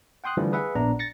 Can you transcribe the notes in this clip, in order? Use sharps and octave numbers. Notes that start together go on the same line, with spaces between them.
F#5 G5 C6 D#6 F#6
D3 E3 F3 G3 A3
G#4 B4 E5 F#5
A#1 B3 D4 A#5
A6 A#6 C#7